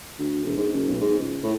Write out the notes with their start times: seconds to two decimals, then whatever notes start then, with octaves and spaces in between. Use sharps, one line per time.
0.19 D2
0.44 E1
0.57 G#2
0.73 F#1
0.89 B1
1.01 G#2
1.18 C#2
1.43 A2